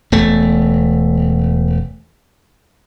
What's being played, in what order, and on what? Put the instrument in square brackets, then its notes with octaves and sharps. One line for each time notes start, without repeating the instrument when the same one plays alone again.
[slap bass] E1 A3